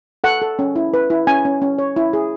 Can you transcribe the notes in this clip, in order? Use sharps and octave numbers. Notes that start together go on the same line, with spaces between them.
A4 F#5
A4
C#4
E4
B4
E4
C#4 G#5
C#4
C#4
C#5
E4
G#4